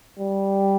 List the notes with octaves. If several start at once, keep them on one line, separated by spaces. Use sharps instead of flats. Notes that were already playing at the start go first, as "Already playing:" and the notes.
G3